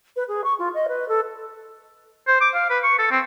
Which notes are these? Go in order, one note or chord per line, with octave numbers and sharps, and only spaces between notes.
B4
G#4
C#6
F4
D#5
B4
A4
C5
D6
F5
B4
C#6
A4
C4